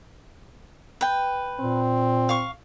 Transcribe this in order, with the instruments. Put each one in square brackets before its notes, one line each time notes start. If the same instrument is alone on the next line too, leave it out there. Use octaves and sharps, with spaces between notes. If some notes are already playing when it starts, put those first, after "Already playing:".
[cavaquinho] B4 G5
[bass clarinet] A#2 [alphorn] C4
[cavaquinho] F5 C#6